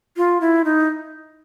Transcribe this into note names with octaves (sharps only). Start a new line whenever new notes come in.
F4
E4
D#4